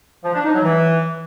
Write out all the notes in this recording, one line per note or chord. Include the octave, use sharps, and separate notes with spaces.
F3
D4
D#4
F#3
E3